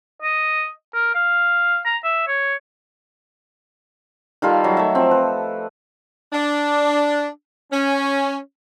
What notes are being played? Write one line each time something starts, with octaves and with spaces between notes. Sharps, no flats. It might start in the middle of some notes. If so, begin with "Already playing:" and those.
D#5
A#4
F5
A#5
E5
C#5
D#3 G3 F4 A4
F#3
A3 E5
F3 C4
B4
D4
C#4